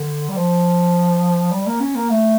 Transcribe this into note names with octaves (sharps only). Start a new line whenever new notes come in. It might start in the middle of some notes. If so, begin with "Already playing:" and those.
Already playing: D3
G3
F3
G3
A#3
C#4
A#3
A3